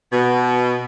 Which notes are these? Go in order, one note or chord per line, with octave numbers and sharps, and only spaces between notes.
B2